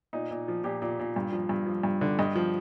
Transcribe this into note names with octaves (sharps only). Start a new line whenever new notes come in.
A#2 D#4
A#2
F3
A#2 G4
A#2
A#2
G2
F3
G2
F3
G2
D3
G2 D#5
F3